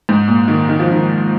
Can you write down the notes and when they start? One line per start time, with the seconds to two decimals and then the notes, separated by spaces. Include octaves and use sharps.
0.09 G#2
0.28 A#2
0.48 D#3
0.69 D#3
0.79 F3
0.92 D#3